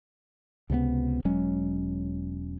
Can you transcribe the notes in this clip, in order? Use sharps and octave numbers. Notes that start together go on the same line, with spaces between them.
C#2 C3 A3 B3
E1 F#3 G#3 C#4